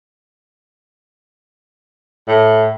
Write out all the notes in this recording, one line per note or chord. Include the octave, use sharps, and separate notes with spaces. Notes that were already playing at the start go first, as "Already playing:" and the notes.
A2